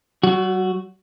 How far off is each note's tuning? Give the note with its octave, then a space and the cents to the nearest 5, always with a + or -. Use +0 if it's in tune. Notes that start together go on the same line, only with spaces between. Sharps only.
F#3 +45 F#4 +0